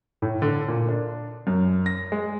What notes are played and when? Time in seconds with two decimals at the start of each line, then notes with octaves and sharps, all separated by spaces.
0.22 A2
0.42 D3
0.68 A#2
0.89 D4
1.47 F#2
1.86 A#6
2.12 G#3